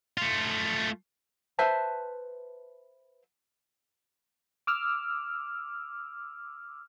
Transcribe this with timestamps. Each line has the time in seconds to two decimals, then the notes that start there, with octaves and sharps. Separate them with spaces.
0.18 A3 F4
1.59 B4 C5 E5 A5
4.67 D6 E6 F6